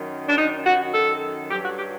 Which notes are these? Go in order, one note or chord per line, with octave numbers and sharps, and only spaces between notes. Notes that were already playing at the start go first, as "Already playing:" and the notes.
Already playing: F#2 D#3 F#3
D4
D#4
F#4
A4
G2 F#3 G4
F#4
G4